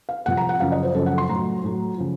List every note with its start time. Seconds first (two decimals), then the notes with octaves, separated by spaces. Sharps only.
0.09 F5
0.26 C2 C3 F3 F#5
0.37 A#5
0.49 F#5
0.60 F#2 C#3 F3 F5
0.72 D#5
0.83 C5
0.95 F#2 C#3 F3 A4
1.06 F#5
1.18 C6
1.29 A2 F#3 A#5
1.64 A2 F#3
1.98 C#3 F3